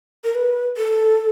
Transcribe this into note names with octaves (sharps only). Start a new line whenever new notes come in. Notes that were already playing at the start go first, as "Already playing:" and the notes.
A#4
B4
A4